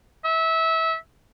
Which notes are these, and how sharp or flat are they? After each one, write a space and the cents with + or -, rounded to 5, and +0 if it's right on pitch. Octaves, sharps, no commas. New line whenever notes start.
E5 -25